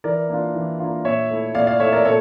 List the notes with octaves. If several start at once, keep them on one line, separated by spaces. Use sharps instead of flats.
E3 A#4 D5
A#3 D4 F4
E3
A#3 D4 F4
A#2 C#5 E5
A3 E4
A#2 D5 F5
D5 F5
A3 E4 C#5 E5
A#4 D5
A#2 A4 C#5